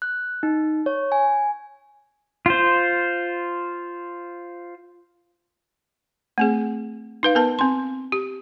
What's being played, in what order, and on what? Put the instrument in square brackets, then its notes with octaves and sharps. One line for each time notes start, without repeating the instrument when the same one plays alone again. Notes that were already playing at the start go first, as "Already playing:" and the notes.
[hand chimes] F#6
D#4
C#5
G#5
[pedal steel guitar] F4 C5
[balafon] A3 C4 G#4
D#4 B4 F5
B3 A#4 B4 A5
C4 C6
G4